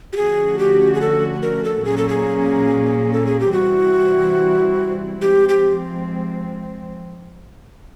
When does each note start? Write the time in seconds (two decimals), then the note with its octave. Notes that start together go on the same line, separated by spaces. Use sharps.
0.13 G4
0.16 D3 F3 A3 C#4 F#4 G#4
0.59 G4
0.94 G#4
1.01 A4
1.42 A#4
1.64 A4
1.85 A#2 F#3 A#3 C#4 G#4
1.98 A4
2.09 G#4
3.13 A4
3.26 G#4
3.40 G4
3.52 C3 E3 G3 C4 E4 F#4
5.21 F3 G#3 C4 G4
5.49 G4